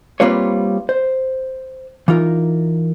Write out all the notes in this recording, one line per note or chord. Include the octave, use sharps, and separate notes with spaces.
G3 A#3 C4 F4 B4 C#5
C5
E3 D#4 F4 A#4